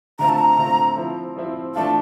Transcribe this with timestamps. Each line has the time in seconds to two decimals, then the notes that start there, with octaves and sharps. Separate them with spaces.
0.19 D3 A3 C4 F4 A#5
0.29 A5
0.38 A#5
0.58 D3 A3 C4 F4
0.97 F3 C4 E4
1.36 F3 C4 E4
1.75 E3 A3 D4 F4 A5